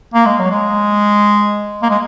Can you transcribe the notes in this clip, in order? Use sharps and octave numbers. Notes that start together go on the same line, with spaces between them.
A#3
G#3
F#3
G#3
A#3
G#3